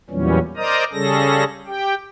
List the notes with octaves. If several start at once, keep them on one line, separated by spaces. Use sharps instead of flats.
E2 A#2 E3 F#3 G3 C#4
A#4 C5 D5 D#5 A#5 D#6
C#3 G3 C#4 G#4 A4 A#6
G4 G5